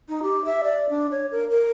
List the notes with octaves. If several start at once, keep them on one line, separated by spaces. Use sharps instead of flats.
D#4
G4
E5
D5
D4
C#5
A#4
A#4